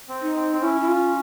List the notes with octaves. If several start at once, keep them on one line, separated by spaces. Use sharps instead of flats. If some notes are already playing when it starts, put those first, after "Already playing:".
C4
D#4
C4
C4
C#4 E4
E4
F4